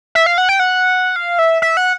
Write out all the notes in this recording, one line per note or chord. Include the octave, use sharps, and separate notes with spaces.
E5
F5
F#5
G5
F#5
F5
E5
E5
F#5